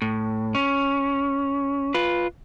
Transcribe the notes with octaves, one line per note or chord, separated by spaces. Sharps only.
A2
C#4
F4 B4